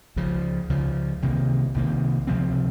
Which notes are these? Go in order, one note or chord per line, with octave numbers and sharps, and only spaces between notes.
C#2 C#3 F3
C#2 C#3 F3
C2 C3 D#3 A#3
C2 C3 D#3 A#3
C#2 C3 F3 C4